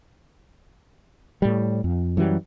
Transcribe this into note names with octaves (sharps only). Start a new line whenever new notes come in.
A2 G3
F2
F#2 E3 F#3 G3